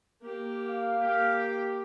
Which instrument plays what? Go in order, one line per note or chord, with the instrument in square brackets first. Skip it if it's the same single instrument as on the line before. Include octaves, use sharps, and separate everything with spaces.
[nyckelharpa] A#3 G4
[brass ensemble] F5
[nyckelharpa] A#3 [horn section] G4